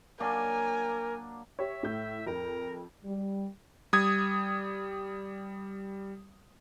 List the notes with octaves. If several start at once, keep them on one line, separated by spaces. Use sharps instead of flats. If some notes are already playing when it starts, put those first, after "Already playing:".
F#3 A#3 D4 A#4 G#5
G4 C#5 E5
A2 G6
F2 A#4
G3
G3 D#6 G#6